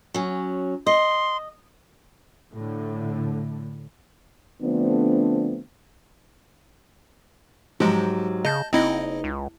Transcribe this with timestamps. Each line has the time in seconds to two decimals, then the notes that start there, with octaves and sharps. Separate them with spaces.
0.14 F#3 C#4
0.87 D#5 C6
2.53 A2 D3
4.62 D3 F3 A3 B3 C4 D4
7.80 G#2 F3 F#3 G#3 G4
8.45 C#3 D#5 A5 G6
8.73 F#1 C4 D#4 E4 D#5
9.24 C#2